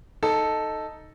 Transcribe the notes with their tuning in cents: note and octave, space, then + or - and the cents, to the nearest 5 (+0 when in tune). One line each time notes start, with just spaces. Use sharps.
D#4 +0 A4 +0